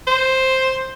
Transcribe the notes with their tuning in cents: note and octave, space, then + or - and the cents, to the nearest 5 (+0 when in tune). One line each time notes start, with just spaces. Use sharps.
C5 +5